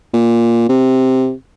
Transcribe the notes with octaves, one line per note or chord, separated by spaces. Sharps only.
A#2
C3